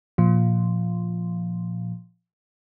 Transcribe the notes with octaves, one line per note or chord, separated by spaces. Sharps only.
A#2 F3